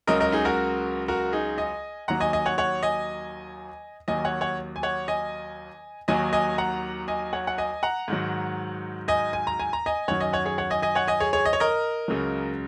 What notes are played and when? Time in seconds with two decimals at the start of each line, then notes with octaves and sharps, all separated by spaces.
0.07 C#2 C#3 F#3 A#4 D#5
0.20 A#4 D#5
0.32 D#4 G#4
0.45 F#4 A#4
1.08 F#4 A#4
1.33 D#4 G#4
1.58 D#5 G#5
2.08 D#2 D#3 F#3 F#5 A#5
2.20 D#5 G#5
2.33 D#5 G#5
2.46 C#5 F#5
2.58 C#5 F#5
2.83 D#5 G#5
4.08 D#2 D#3 F#3 D#5 G#5
4.25 C#5 F#5
4.41 C#5 F#5
4.76 G#5
4.83 C#5 F#5
5.08 D#5 G#5
6.08 D#2 D#3 F#3 D#5 G#5
6.33 D#5 G#5
6.58 F#5 A#5
7.08 D#5 G#5
7.33 C#5 F#5
7.47 F#5
7.58 D#5 G#5
7.83 F#5 A#5
8.08 G#2 D#3 F#3
9.08 D#5 G#5
9.33 G#5
9.47 A#5
9.60 G#5
9.73 A#5
9.86 D#5 G#5
10.08 F#2 D#3 F#3 C#5 F#5
10.20 D#5 G#5
10.33 C#5 F#5
10.45 G#4 C#5
10.58 C#5 F#5
10.70 D#5 G#5
10.82 D#5 G#5
10.95 C#5 F#5
11.08 D#5 G#5
11.20 G#4 C#5
11.33 G#4 C#5
11.46 D#5
11.53 C#5
11.60 A#4 D#5
12.08 C#2 C#3 F#3